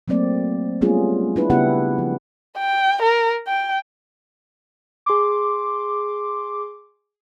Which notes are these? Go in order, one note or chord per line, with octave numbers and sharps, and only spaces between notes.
F#3 A3 A#3 C4 D5
G3 A3 B3 C#4 F4 G#4
D4 E4 B4
C#3 B3 E4 G4 F#5
F3
G5
A#4
G5
G#4 C6 D6